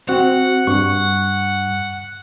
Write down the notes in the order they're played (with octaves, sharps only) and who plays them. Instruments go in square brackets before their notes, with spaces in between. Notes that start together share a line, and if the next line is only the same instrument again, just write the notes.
[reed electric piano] C4 F#4 [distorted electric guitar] F#5
[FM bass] G2 [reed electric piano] C#6